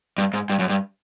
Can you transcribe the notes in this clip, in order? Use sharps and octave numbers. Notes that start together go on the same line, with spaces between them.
G2
G#2
G2
F#2
G2